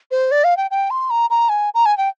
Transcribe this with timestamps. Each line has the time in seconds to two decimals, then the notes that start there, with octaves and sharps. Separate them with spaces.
0.11 C5
0.31 D5
0.44 F5
0.57 G5
0.71 G5
0.90 C6
1.10 A#5
1.30 A#5
1.49 G#5
1.74 A#5
1.86 G#5
1.97 G5